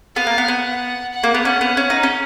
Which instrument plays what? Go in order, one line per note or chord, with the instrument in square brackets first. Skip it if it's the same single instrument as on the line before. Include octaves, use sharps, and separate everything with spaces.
[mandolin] B3 [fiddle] F5
[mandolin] A#3
B3
[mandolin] B3 [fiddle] F#5
[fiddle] F#5
[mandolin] A#3
B3
[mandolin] C#4 [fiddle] F#5
[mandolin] B3
C#4
D#4
C#4